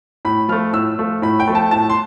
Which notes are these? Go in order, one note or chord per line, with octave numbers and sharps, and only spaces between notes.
A2 B5
F3 A3 F6
A2 E6
F3 A3
A2 B5
G5
F3 A3
A5
A2 A5
C6